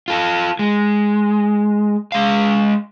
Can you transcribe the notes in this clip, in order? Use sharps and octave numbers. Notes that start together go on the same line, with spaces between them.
F4 A4
G#3
G#3 F5